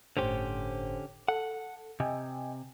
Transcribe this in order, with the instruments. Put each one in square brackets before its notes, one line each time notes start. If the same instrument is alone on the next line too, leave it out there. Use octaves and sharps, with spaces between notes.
[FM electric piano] G1 A2 C5 [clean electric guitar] D3 C#4 G4
[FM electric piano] A4 [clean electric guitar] F#5
[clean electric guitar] C3 [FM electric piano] D#5 G5 G#5